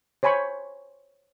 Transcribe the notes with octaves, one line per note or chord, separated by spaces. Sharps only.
C5 C#5 G#5 B5 C#6